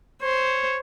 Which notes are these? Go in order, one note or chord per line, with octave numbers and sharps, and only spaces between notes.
C5 C#5